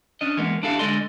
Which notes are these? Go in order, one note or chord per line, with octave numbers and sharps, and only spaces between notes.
C#4 D4 D#5
E3 G#3 A#3 B3
D4 E4 G4 A4 F5
D3 G#3 D5 D#5 C6